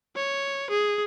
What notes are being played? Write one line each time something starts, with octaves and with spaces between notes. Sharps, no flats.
C#5
G#4